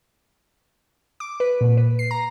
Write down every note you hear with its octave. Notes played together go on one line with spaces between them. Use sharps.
D6
B4
A#2
B4
C7
A#5